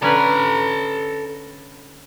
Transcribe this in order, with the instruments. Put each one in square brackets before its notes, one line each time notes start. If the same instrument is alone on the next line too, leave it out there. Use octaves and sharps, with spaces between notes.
[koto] D3 C#4 B4 [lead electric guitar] A4 A#5